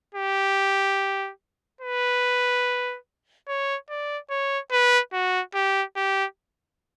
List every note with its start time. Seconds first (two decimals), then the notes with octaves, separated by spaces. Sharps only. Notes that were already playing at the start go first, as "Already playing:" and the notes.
0.15 G4
1.81 B4
3.48 C#5
3.89 D5
4.30 C#5
4.71 B4
5.13 F#4
5.55 G4
5.96 G4